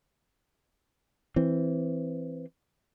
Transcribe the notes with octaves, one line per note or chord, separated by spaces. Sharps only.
E3 C4